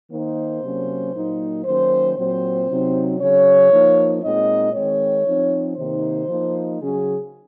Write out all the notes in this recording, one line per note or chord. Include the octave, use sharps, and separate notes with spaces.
D#3 A#3 D#4 C5
C3 F#3 A#3 C#4
A#2 F#3 A#3 D#4
D#3 F#3 A#3 C#4 C5
A#2 F#3 C4 C5
C3 F#3 C4 D#4
C#3 F#3 C#4 C#5
F3 A#3 D#4
A#2 G#3 C4 D#4 D#5
D#3 G#3 C4 C#5
F3 C4 D#4
C3 D#3 A#3 D#4 C5
F3 A#3 D#4
C#3 F#3 C#4 G#4